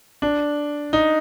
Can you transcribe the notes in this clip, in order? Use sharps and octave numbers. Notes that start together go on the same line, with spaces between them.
D4
D#4